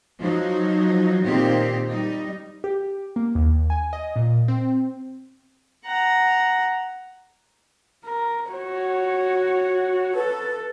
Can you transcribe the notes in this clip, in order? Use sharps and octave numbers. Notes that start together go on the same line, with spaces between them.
F3 F#3 D#4
A#2 D#3 C4 D#4 G4
G3 D#4
G4
A#3
D#2
G#5
D#5
A#2
C4
F#5 A#5
A#4
F#4 C#5
A4 B4